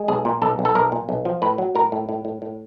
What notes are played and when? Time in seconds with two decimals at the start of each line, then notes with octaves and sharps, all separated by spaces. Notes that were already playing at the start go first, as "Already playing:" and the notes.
Already playing: G#3
0.08 B1 G#4
0.25 A#2
0.42 B1 A4
0.59 B1
0.65 A4
0.75 B1 A#4
0.92 A#2
1.09 B1
1.25 F3
1.42 A2 B4
1.58 F#3
1.75 A2 A#4
1.92 A2
2.09 A2
2.25 A2
2.42 A2